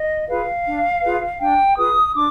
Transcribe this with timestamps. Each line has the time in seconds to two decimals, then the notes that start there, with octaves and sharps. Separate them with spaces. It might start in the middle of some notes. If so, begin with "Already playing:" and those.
Already playing: D#5
0.28 F4 G#4 B4 F5
0.66 D4
1.02 F4 G#4 B4
1.40 D4 G5
1.77 F4 G#4 B4 D#6
2.13 D4 D6